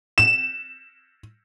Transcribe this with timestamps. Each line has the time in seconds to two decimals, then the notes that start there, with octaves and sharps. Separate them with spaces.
0.18 E7